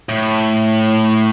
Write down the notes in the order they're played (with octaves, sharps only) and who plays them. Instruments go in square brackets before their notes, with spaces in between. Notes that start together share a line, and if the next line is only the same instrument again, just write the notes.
[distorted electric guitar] A2